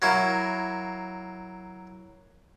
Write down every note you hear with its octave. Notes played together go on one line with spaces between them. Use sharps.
F#3 A#3 E4